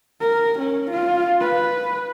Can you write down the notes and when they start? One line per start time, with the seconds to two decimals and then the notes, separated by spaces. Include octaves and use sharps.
0.21 A#4
0.59 C#4
0.91 F4
1.41 B4